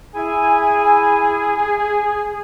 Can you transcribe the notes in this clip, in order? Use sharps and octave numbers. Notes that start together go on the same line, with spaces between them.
E4 G#4 G#5